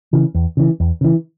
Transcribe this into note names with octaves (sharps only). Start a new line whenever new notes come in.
C#3 E3
E2
C#3 E3
E2
C#3 E3